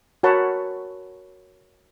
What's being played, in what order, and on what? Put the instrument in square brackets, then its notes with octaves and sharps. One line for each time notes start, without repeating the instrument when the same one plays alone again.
[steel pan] F#4 A#4 C#5 F#5 A5 B5